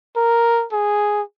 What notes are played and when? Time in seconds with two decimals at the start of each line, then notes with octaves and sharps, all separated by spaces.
0.16 A#4
0.72 G#4